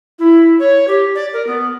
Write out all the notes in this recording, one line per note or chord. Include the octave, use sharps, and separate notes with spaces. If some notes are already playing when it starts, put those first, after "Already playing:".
E4
C#5
G4
D5
A#4
B3